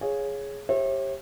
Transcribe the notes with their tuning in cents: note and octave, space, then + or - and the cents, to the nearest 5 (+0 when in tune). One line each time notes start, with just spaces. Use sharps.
G#4 +0 C#5 +0 F5 +0
G4 +0 C#5 -45 E5 -10